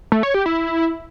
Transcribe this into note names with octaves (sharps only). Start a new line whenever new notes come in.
A3
C#5
G4
E4